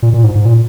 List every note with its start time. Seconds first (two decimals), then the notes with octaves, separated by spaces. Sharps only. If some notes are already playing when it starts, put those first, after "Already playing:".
0.02 A#2
0.13 A#2
0.24 G#2
0.35 G#2
0.45 A#2